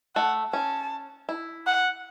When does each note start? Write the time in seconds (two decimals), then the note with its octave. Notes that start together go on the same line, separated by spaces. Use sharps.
0.15 A3 F#5
0.53 C#4 A5
1.29 E4
1.66 F#5